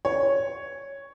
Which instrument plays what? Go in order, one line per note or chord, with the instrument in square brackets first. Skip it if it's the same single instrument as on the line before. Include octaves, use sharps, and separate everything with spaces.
[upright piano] C#5